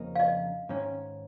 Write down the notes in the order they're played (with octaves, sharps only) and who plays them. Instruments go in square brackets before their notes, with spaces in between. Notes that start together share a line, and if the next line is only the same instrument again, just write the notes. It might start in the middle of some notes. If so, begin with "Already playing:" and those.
Already playing: [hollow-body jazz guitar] F2 C#3 A#3 D#4
[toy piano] F5
D#5
[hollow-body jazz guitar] G#2 D#3 C#4